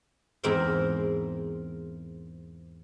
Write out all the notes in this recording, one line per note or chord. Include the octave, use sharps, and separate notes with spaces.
E2 G#2 C4 A#4 C5